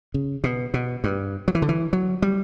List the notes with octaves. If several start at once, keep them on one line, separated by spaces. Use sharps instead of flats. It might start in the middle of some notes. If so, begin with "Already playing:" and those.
C#3
B2
B2
G2
F#3
E3
D3
E3
F#3
G3